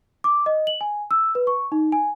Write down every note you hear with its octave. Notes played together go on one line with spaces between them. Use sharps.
D6
D#5
F#7
G#5
E6
B4
C#6
D#4
G#5